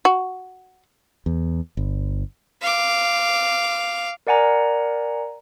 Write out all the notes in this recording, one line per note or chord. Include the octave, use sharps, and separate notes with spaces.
F#4
E2
G1
F5 D6
A#4 D5 F#5 G#5 A#5